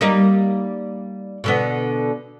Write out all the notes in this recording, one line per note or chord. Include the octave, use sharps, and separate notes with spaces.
G3 A#3 D#4
B2 D3 B3